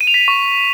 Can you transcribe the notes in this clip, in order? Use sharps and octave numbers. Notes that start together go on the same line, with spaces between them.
D#7
F7
B6
D#7
C#6